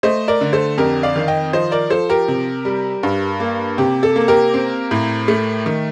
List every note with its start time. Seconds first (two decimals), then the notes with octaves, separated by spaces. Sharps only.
0.03 A3 C5 D#5
0.28 A#4 D5
0.41 D3
0.53 A4 C5
0.78 F2 G4 A#4
1.03 D5 F5
1.16 D#3
1.28 D#5 G5
1.53 F3 C5 D#5
1.71 A#4 D5
1.90 F3 A4 C5
2.09 G4 A#4
2.28 C3
2.65 G3
3.03 G2
3.40 A#3
3.78 C3 G4
4.03 A4
4.16 A#3
4.28 G4 A#4
4.54 C4
4.91 A2
5.28 A3
5.66 D#3